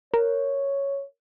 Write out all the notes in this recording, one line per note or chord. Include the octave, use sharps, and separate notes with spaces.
A#4 C#5